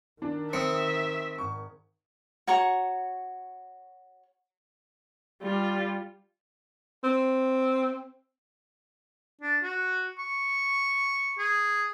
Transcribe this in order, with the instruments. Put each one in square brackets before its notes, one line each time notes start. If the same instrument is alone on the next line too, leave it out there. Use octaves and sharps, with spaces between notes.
[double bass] D#3 [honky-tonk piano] D4
[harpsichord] C4 [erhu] E5 [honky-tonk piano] D#6 C#7
[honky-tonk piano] G#1 C#6
[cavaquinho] F#4 C#5 A#5 C#6
[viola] G3 F4
[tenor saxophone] C4
[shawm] D4
F#4
C#6
G#4